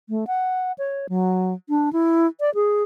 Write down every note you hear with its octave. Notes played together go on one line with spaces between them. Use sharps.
A3
F#5
C#5
F#3
D4
E4
D5
G#4